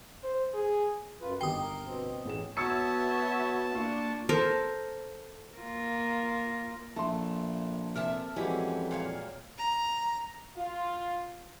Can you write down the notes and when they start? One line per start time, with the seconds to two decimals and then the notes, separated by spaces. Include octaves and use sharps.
0.23 C5
0.54 G#4
1.21 F#2 F4 B4
1.41 G1 D#3 G4 G5 D#6 C7
1.61 A#4
1.85 B2 C4
2.25 A1 G#4 E7
2.57 B3 F#4 C#5 E5 A5 C#6 E6 C#7
3.75 A#3 D4 F4 C#6
4.29 A4 A#4 C5
5.58 A#3 F4 A#4
6.96 A#1 A3 A5 C6
7.95 C3 A4 A#4 E5 A5
8.36 F2 E3 G3 G#3 C#4 E4 F#4 G4
8.91 A#2 C#5 F5
9.58 A#5
10.56 F4